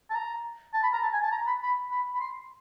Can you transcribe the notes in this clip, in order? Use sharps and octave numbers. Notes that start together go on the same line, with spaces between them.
A5
A#5
A5
B5
A#5
A5
G#5
A5
A#5
B5
B5
B5
B5
C6